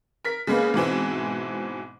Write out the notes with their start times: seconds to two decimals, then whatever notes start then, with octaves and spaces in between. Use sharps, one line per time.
0.24 A#4 B6
0.47 C#3 G#3 A#3 B3
0.74 G#2 B2 E3 C4